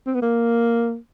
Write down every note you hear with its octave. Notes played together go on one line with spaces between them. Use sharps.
C4
B3
A#3